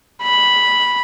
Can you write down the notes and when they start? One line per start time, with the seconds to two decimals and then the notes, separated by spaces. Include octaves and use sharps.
0.23 B5